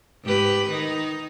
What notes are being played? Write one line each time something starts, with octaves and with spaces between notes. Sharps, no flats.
G#2 G4 B4
D#3 D#4